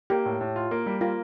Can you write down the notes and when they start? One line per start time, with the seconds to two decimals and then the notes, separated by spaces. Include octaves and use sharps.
0.10 A#3 G4
0.25 A2
0.41 A2
0.56 F4
0.71 A#3
0.86 G3
1.01 A#3 F4